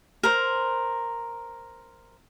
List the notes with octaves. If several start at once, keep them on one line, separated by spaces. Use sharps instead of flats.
A#4 C5